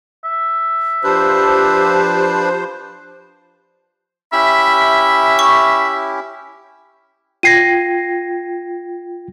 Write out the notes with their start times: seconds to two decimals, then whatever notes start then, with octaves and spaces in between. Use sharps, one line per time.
0.25 E5
1.04 F3 D4 G4 B4 C5
4.33 C#4 E4 G4 E5 B5
5.39 C#6
7.43 F4 G5 G#6 A#6 C7 D#7